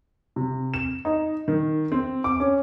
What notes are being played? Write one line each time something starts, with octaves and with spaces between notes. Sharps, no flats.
C3
E7
D#4
D#3
C4
D6
C#4